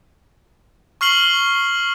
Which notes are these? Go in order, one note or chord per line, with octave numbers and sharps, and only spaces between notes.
C#6 F6 C7 F#7 G7